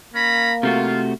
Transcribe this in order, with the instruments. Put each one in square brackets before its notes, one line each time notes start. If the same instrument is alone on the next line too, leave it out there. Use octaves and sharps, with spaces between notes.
[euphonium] A#3 [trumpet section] C#4 A#5 B5
[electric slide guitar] C3 A3 F#4 [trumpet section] F4